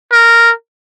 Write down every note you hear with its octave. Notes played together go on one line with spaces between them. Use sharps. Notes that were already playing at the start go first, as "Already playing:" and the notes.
A#4